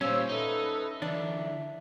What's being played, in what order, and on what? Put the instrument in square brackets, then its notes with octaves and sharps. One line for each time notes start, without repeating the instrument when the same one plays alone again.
[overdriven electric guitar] A#2 G3 [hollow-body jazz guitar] C#4 [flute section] C5 F5 E6
[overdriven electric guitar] D#4 [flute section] A4 B4 E5
[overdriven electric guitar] D3 E3 [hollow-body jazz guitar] D4 [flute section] E5